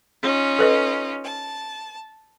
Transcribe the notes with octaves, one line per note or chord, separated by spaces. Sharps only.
C#4 D#4 F4
A4 B4 D#5
A5